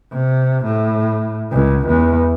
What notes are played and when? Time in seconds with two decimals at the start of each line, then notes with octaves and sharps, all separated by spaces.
0.12 C3
0.65 A2
1.52 C#2
1.87 E2